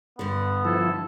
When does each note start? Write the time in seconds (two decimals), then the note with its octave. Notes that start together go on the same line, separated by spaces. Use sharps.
0.19 G2 D3 B3
0.65 F3 E4 A4